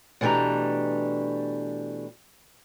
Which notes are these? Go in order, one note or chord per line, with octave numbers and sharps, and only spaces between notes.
B2 E3 A3 D4 G4 A#5